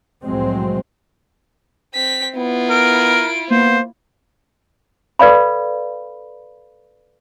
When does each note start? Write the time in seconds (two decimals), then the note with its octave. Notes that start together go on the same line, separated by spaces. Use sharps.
0.25 C2 F2 A2 F#3 G#3 C4
1.94 C4 B6
2.36 B3 E4 F4
2.70 A#4 D7
3.50 A#3 B3 C5
5.19 A4 B4 D5 F5 B5